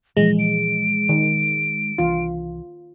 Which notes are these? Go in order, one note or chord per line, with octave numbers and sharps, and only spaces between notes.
A#2 E3 F3 G#3 A#6
D7
D#3
C2 E3 D4 F4